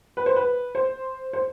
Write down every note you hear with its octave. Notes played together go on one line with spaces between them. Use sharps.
B4
C5
B4
C5
C5